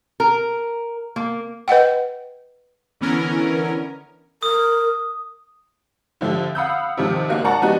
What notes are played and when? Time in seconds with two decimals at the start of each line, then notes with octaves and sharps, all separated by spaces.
0.20 A#4
1.16 A#3
1.68 B4 D#5 F#5 G5
3.01 D3 E3 B3 C#4 A#4
4.43 A#4 D#6
6.21 D3 F3 G4 E5
6.55 F5 F#5 B5 D#6 E6 G6
6.97 C3 D#3 F3
7.29 G#2 C#3 A#3 F#4
7.44 D5 F#5 A5 A#5 C#6
7.61 F3 B3 D4 D#4 F#4 G4